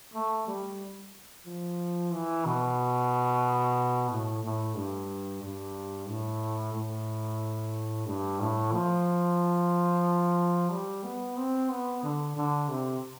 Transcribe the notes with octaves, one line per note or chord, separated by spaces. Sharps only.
A3
G3
F3
E3
B2
A2
A2
G2
G2
A2
A2
G2
A2
F3
G3
B3
C4
B3
D3
D3
C3